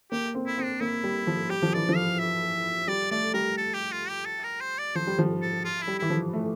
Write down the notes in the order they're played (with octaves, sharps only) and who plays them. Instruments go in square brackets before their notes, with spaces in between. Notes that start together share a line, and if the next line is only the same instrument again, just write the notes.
[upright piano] A#3 [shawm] G4
[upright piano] C4
[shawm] E4
[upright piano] C4
[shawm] D4
[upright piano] A#3 [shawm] E4
[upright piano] G3
F3
[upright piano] G3 [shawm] G4
[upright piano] F3
[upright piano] E3 [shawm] D5
[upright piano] F3
[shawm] F5
E5
[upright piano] G3 [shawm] D5
[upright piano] A3 [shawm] D5
[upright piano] G3 [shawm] A#4
[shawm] A4
G4
F4
G4
A4
A#4
C5
D5
[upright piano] F3 [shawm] C5
[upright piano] G3
F3
[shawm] A4
F4
E4
[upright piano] G3
[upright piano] E3 [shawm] E4
[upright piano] F3
A3